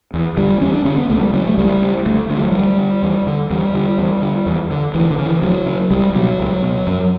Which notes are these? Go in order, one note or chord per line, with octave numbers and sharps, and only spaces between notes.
E2
D3 G3
E2 C#4
D4
D3 C#4
B3
C#2 A3
G3
C#3 F#3
A3
C#2 G3
C#3
D2 A3
D3 A3
G3
F#3
D2 G3
D3
E2
D3
E2 G3
D3
E2
D3
E2
D3
D2 E3
D3
C#3
E3
D2 F#3
C#3
C#2 G3
B2 F#3
C#2
B2
F#2